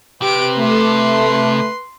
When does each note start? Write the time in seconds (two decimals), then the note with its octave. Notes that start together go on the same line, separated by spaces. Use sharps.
0.22 C3 G4 B4 D7
0.58 A3 C6